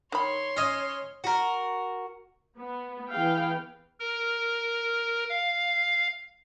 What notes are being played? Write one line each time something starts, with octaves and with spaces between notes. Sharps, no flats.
D#3 C#5 B5 C6
C#4 D#5
F#4 A#4
B3
E3 B3 G#4 F5 G5
A#4
F5